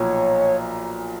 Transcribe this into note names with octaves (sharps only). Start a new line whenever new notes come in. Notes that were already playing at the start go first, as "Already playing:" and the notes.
Already playing: B1 A#2 F3 C#5